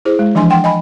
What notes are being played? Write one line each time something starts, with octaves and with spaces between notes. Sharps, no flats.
E4 G#4 C5
G#3
E3 F3 D4 G#5 C6
F#5 G5 C6
D#5 G#5 B5